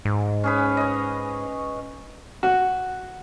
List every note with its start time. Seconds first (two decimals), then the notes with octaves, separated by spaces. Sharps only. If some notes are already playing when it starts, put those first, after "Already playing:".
0.05 G#2
0.44 C#4 G#4 B4
0.77 C#5 D#5
2.43 F#4